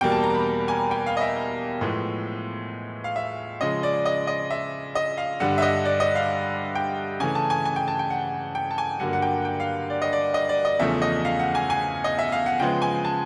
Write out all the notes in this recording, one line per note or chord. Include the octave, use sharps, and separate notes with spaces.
E2 B2 G3 A#3 G5
A5
A#5
B5
G#5
G5
F5
D#5
E5
A2 F3 G#3 B3
F5
E5
C#3 F3 G#3 D#5
D5
D#5
D#5
E5
D#5
F5
G2 D3 G3 F#5
E5
D#5
D5
D#5
F5
G5
C#3 E3 A3 G#5
A5
G#5
G#5
G5
A5
G5
F#5
G5
A5
G#5
G2 D3 F#3 A#3 F#5
F#5
G5
G5
F5
D5
D#5
D5
D#5
D5
D#5
E2 C#3 F3 A3 E5
D#5
F5
F#5
G#5
G#5
D#5
E5
F5
F#5
C#3 F3 G#3 B3 G5
G#5
A5